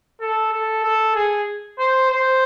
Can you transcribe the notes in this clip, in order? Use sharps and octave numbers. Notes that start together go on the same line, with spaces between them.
A4
A4
A4
G#4
C5
C5